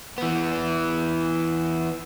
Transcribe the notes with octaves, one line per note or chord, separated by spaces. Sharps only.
E3 B3